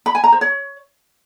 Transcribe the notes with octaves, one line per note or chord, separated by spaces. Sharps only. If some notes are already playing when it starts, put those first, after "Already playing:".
B5
G#5
A#5
C5
C#5